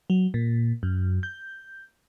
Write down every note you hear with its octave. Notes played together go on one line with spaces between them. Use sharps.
F#3
A#2
F#2
G6